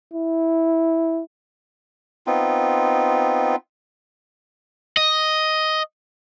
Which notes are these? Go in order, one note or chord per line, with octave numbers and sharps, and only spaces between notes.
E4
B3 C4 D#4 F4
D#5